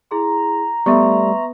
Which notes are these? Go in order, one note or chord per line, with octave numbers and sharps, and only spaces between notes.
E4 G#4 A#5 C6
G3 A3 B3 E5 C6 C#6